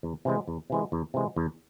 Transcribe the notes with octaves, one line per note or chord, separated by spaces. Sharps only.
E2
C3 E3 G#3
E2
C3 E3 G#3
E2
C3 E3 G#3
E2